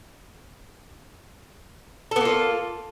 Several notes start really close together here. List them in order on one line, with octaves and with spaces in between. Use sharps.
A4 B3 A#3 F4